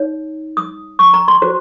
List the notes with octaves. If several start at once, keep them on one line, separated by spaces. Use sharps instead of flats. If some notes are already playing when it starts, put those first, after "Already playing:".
Already playing: D#4 C#5
D#6
C#6
A#5
C6
F#4 C5